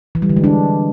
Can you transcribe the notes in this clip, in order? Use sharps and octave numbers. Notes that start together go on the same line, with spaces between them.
E3
G3
D3
G#3
D4